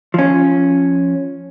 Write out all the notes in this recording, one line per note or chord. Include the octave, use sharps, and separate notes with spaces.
F3 C#4